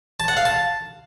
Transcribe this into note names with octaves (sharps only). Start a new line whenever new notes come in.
A5
F#5
F5
A5